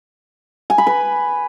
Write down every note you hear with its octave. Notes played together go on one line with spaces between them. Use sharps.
G#5
B5
B4